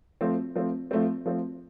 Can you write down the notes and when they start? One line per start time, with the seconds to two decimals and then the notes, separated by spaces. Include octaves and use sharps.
0.21 F3 A3 C4
0.55 F3 A3 C4
0.91 F3 A3 C4
1.26 F3 A3 C4